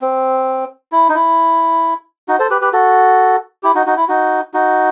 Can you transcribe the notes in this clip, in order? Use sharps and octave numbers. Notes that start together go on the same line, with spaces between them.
C4
E4
D#4
E4
D#4 F#4
A4 C5
G4 B4
G4 B4
F#4 A4
E4 G4
D#4 F#4
D#4 F#4
E4
D#4 F#4
D#4 F#4